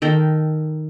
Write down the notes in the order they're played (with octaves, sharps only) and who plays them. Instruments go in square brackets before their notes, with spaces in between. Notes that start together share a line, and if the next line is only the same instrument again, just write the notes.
[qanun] D#3 A4 G5